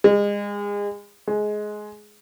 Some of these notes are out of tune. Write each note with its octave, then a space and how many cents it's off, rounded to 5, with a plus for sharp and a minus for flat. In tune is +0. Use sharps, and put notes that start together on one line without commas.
G#3 -30
G#3 +15